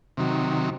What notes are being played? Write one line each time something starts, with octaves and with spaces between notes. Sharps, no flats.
C3 D#3 F#3